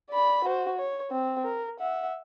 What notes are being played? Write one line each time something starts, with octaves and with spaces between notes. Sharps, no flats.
D5 B5
F#4 C5
C#5
C4
A#4
E5 F#5